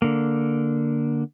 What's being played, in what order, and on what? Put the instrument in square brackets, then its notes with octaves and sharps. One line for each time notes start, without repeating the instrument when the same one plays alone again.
[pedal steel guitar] D3 A#3